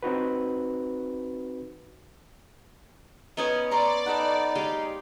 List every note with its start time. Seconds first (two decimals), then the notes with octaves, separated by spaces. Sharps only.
0.03 C4 D#4 F#4 B4
3.37 B3 C#4 D#4 C#5 D#6
3.71 D5 A#5 C6 C#6
4.06 D#4 A4 B4 F#5
4.55 G#3 G4 F5